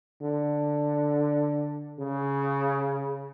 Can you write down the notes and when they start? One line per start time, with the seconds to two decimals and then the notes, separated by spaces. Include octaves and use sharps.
0.22 D3
2.00 C#3